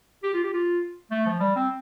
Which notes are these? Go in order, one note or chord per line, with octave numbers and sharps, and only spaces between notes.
G4
F4
G4
F4
A3
F3
G3
C4